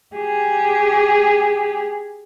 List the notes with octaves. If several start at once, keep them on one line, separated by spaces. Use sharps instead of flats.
G4 G#4